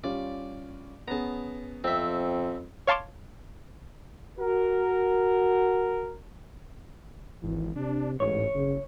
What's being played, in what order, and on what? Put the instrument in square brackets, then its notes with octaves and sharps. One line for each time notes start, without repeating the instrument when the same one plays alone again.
[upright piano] G3 C#4 F4 [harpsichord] D5
[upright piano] B3 C#4 G#4 [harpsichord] A5 A#5
[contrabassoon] F2 [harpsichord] C4 E5
[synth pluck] C#5 F5 A5 C6 D6
[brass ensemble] F#4 A#4
[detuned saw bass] G#1 [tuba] E3
[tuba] C3 [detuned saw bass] D4
[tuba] A1 [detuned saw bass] G#2 [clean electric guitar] C#5
[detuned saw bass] F#1 [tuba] C#3